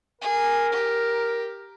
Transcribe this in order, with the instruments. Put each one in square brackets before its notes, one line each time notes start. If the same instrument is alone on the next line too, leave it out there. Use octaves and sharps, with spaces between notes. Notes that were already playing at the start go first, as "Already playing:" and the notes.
[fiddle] G#4 [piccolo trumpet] A#4
[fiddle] G4